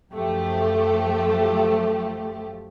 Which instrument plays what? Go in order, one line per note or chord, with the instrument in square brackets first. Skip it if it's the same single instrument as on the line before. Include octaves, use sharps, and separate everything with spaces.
[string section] F#2 F3 A3 G4